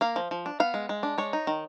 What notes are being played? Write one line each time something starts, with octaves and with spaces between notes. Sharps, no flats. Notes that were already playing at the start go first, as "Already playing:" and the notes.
A#3 F5
F3
F3
D4
B3 F5
G#3
G#3
D4
G#3 C#5
D#4
D#3